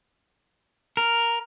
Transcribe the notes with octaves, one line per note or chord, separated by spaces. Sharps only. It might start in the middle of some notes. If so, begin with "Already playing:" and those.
A#4